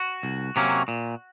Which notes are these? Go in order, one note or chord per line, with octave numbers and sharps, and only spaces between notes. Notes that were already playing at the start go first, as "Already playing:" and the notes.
Already playing: F#4
C2
C3 F#3 A#3 C#4
A#2